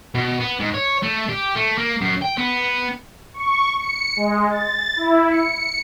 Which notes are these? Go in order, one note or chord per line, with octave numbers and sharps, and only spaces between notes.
B2
B3
G#2
C#5
A3
G4
A3
A#3
F#2
G5
B3
C#6
C#7
G#3
A6
E4
C#7